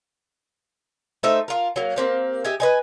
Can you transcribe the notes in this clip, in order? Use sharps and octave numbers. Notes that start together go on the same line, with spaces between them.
A3 D#4 C5 E5
F4 A#4
F#3 A#3
A#3 C4 G4
G4 D#5 E5 G#5
B4 D#5 G#5